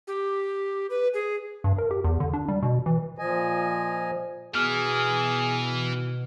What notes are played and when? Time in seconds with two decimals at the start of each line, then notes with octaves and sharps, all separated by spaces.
0.07 G4
0.90 B4
1.14 G#4
1.64 G2
1.78 A#4
1.91 G4
2.04 E2
2.20 D3
2.33 D4
2.48 G3
2.63 B2
2.86 E3
3.18 A#2 F3 D#5 G#5
4.55 B2 E3 G#4 F6